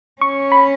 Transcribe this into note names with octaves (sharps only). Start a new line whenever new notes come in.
C#4 C#6
B5